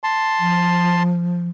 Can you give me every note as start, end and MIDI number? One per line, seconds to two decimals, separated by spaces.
0.04 1.03 81
0.04 1.03 84
0.39 1.48 53